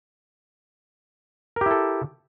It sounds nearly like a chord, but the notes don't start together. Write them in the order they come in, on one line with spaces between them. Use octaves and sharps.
A#4 G4 E4 A4